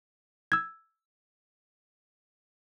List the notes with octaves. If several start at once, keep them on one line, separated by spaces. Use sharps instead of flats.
E6 G#6